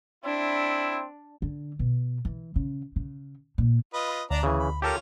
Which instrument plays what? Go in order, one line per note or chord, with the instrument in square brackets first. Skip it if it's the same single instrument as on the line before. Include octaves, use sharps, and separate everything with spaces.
[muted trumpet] C4 [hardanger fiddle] D4 [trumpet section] E4
[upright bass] D3
B2
E3
C#3
C#3
A#2
[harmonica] F4 B4 D#5
[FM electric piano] D2 [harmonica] D4 D5 A#5
[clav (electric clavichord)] C#3 E3 [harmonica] G#4
[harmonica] B5
[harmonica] C#4 F4 C#5 [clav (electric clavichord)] G4 A4 A#4